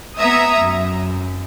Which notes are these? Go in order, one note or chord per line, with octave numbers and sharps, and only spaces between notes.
B3 E5 A#5 D#6 G#6
F#2